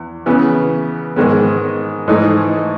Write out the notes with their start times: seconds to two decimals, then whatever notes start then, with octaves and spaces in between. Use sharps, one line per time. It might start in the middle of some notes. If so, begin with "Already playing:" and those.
Already playing: E2
0.26 C#3 E3 B3
1.16 G#2 D#3 G#3 B3
2.08 G#2 E3 A3 D#4